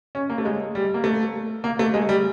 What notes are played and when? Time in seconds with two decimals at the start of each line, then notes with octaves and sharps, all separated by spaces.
0.15 C#4
0.30 A#3
0.38 A3
0.45 G#3
0.75 G3
0.94 A#3
1.04 A3
1.64 A#3
1.79 A3
1.94 G#3
2.09 G3